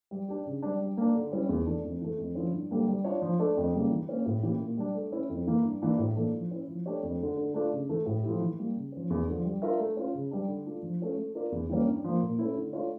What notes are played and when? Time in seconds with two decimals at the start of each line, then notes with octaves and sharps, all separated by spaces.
0.11 G3
0.28 D4 G4
0.45 C#3
0.63 G3 D4
0.80 G3
0.97 A#3 D4
1.15 D3
1.32 G3 C#4 E4
1.49 E2
1.67 E3 A3 D4
1.84 F2
2.01 E3 A3
2.18 F2
2.35 D3 F3 C#4 E4
2.53 G2
2.71 D3 G3 A#3 D4
2.88 G3
3.04 D4 F4 C#5
3.22 F3
3.39 A3 D4 A4 D5
3.57 F2
3.74 C#3 G3 A#3 C#4
3.91 E3
4.09 A#3 C#4
4.26 A2
4.43 E3 A#3 C#4 G4
4.61 A#2
4.77 G3 D4
4.95 A3
5.12 C#4 E4
5.30 F2
5.47 E3 A#3
5.64 G2
5.82 E3 A#3 D4
5.98 A2
6.16 E3 A#3 D4 A4
6.34 F3
6.51 C#4 E4
6.68 F3
6.86 A3 D4 G4 C#5
7.03 F2
7.20 D3 A3
7.37 D3
7.54 A3 D4 F4
7.72 C#3
7.89 E3 A3
8.06 A2
8.23 F3 A3 E4 G4
8.41 E3
8.59 G3 A#3
8.76 C#3
8.92 F3 C#4
9.10 E2
9.28 D3 F3
9.45 G3
9.62 D4 F4 A#4 E5
9.79 A3
9.97 C#4 F4
10.14 C#3
10.31 G3 D4
10.48 D3
10.66 A3 D4 F4
10.83 F3
11.00 A3 C#4 F4
11.17 A3
11.35 D4 F4 A#4 D5
11.52 E2
11.69 E3 G3 A#3 C#4
11.87 G2
12.04 F3 A#3
12.22 A#2
12.39 A3 C#4 E4
12.56 D3
12.73 A3 D4 F4 C#5